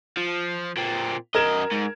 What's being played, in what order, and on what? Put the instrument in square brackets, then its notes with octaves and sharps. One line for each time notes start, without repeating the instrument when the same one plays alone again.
[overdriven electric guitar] F3
A#2 C4
[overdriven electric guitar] F#2 D#5 [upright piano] A#4 G#6 E7
[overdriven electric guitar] G#2